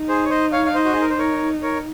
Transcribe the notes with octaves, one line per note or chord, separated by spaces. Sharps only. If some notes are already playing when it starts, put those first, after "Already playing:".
Already playing: D#4
G#4 C5
C#5
C5 D#5
C#5 F5
F5
C5 D#5
F#4
G#4
A#4
C5
A#4 C#5
A#4 C#5